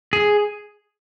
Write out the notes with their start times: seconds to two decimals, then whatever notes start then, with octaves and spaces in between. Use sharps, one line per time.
0.13 G#4